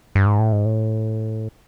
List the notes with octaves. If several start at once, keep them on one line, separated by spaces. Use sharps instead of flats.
G2
G#2
A2
G#2
A2